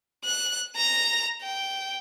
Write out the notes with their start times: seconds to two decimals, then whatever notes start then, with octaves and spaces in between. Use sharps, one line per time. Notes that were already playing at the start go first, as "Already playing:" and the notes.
0.24 F#6
0.76 A#5 F7
1.42 G5